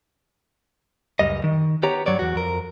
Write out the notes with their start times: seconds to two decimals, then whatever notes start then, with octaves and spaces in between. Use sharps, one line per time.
1.19 C#2 F#2 G3 D#5
1.44 D#3
1.83 B3 G4 C#5 A#5
2.06 G2 F#3 C#5 D5
2.19 E2 F#4
2.35 F2 A#4